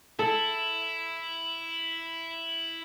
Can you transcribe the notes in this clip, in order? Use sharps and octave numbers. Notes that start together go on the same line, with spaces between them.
E4 A4